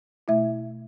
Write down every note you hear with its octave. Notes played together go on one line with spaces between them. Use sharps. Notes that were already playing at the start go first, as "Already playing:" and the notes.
B2 A3 E4 E5